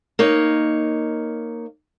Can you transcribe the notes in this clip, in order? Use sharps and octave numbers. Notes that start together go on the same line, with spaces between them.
A#3 D#4 C#5